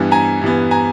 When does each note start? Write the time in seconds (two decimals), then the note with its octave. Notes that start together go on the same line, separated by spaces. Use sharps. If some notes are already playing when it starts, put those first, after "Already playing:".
Already playing: G2 E3 G3 B3
0.11 G#5 A#5
0.41 G2 E3 G3 B3
0.71 G#5 A#5